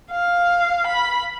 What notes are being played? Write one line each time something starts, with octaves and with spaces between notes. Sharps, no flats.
F5
B5